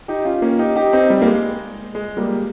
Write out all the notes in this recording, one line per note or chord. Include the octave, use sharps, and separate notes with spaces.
D#4 G4
C#4 F4
A#3 C#4
D#4 G4
D#4 G4
C4 D#4
G3
A#3
G#3
G#3
G3 A#3